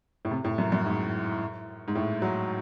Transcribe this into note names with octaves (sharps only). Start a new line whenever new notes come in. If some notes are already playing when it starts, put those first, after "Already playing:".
A2
C3
A2
F#2
F#2
G#2
G#2
A2
F#3